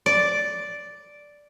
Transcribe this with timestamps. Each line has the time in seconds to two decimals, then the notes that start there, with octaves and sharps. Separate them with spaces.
0.06 D5